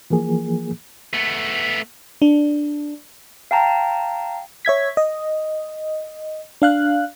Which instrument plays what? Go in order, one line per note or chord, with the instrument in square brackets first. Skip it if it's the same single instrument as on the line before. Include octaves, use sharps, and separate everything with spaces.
[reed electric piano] E3 F3 A#3 G#4
[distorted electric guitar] A3 B3
[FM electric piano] D4
[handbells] F5 G5 A5 A#5
[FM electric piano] C#5 E5 G#6 B6
D#5
D4 F5 F#6